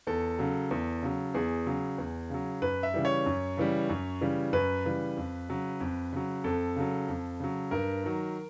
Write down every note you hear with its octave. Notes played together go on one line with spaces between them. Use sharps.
E2 A4
C#3 F#3
E2
C#3 F#3
E2 G#4
C#3 F#3
E2
C#3 F#3
F#2 B4
E5
C#3 E3 G3
C#5
F#2
C#3 E3 G3
F#2
C#3 E3 G3
F#2 B4
C#3 E3 G3
F2
C#3 F#3
F2
C#3 F#3
F2 A4
C#3 F#3
F2
C#3 F#3
G2 A#4
D#3 F#3